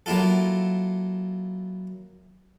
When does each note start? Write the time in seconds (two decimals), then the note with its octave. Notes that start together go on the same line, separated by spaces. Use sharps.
0.06 F#3 A#3 E4 F4 A4